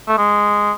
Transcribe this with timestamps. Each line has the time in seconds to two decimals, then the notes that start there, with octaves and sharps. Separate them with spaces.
0.08 A3
0.18 G#3